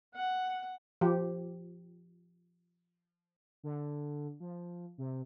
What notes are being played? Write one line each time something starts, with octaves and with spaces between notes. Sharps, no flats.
F#5
F3 G4
D3
F3
C3